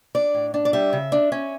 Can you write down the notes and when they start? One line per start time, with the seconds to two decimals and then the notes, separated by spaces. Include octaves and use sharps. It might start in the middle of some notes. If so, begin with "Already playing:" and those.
0.15 D4 D5
0.34 A2
0.54 D4
0.65 D5
0.73 G3 E5
0.93 C#3
1.12 D4
1.32 C#4